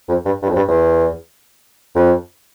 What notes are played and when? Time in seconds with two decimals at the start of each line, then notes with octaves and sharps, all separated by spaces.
0.08 F2
0.25 G2
0.42 G2
0.49 F2
0.56 G2
0.68 E2
1.95 F2